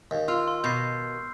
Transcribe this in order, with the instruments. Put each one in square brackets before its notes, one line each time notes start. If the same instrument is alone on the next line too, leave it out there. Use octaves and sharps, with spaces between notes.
[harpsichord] D#2
[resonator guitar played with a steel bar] F4 [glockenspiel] E6 F6
[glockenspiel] C6
[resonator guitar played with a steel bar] B2 [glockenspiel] G6 C7